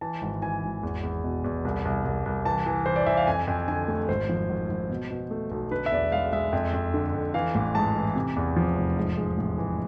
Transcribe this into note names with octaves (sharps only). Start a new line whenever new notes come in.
E3 A5
G#1
E3 G#5
G#1
E2
E2
B2
E2
C2
C2
C2
C2
E3 A5
E3
E3 C5
D5
E3 E5
F5
F2 G#5
F2
D3 G#5
A3
G#1 C5
F3
G#1
G#1
B2
B2
A3
B1
D3 B4
E5
E2 D5
G#3 F5
G#3 E5
F2
F2
D3
F2
E3 F5
A1
G#2 A5
E3
C3
E2
F3
F1
G#2
G#3
A1
E3